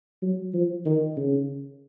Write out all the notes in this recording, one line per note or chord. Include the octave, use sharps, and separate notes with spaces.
F#3
F3
D#3
C#3